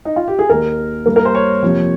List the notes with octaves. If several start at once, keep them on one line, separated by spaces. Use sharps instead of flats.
D#4
F4
G4
G#4
D#2 D#3 A#3 A#4
G2 G3 A#3 A#4
A#4
C5
C#5
F2 C3 F3 A#3